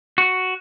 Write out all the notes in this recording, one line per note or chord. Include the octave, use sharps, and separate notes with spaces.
F#4